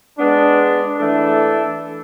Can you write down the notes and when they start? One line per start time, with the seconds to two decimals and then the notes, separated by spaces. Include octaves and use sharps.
0.18 G#3 B3 D4
0.98 E3 A3 D4 A4